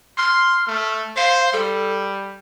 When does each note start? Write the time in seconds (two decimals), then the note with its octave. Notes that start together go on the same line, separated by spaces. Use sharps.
0.18 C6 F6
0.67 A3
1.17 C5 F5
1.53 G3 A4